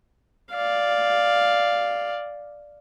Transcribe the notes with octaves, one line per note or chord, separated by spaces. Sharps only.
D5 F5